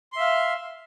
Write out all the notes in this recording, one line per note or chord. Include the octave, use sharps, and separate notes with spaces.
E5 F5 C6